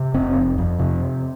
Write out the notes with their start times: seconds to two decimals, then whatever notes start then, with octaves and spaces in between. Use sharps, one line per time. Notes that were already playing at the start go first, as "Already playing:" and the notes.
Already playing: C3
0.14 F1 C4
0.36 F2
0.58 F2
0.79 C3